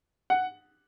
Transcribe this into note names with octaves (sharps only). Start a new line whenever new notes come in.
F#5